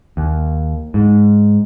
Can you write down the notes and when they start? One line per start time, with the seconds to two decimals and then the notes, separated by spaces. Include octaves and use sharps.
0.17 D#2
0.94 G#2